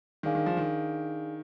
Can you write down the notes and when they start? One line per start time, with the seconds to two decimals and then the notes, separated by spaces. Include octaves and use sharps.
0.23 D#3 D4 G#4 D5 F5 G#5
0.35 D#3
0.46 F3
0.57 D#3